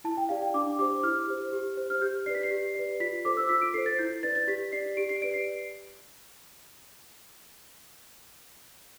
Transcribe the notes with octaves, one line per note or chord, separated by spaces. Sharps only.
E4 A5
G5
G4 D5 F5
G5
D4 D6
G4 C5 D6
E4 F6
G4 C5
G4
C5
F6
G4 G6
B4 D5 C7
B6
C7
G4
B4 D5
F4 B6
A4 C5 D6
E6
F4 B6
D7
A4 C5 C7
A6
E4 G6
B4 D5 A6
A6
G4 B6
D5 C7
G4 D7
C7
B4 D5 D7
C7